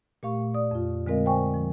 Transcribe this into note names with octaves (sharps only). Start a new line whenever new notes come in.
A#2 A3 G4 F5 C#6
D5 D#6
F2 F4
D3 G#3 C4 A#4 D#5 F5
C5 G5 G#5 C#6
F3